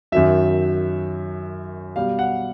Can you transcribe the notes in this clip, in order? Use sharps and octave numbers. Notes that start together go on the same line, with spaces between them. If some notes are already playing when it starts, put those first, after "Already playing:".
F#2 D#3 F#3 E5
B2 G3 F5
F#5